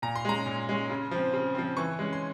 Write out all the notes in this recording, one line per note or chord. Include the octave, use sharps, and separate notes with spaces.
A#2 A#5
C6
G#3 C#4 A#5
A#2
G#3 C#4
C#3
F3 C4
C#3
F3 C4
E3 C#6
G#3 C#4
C6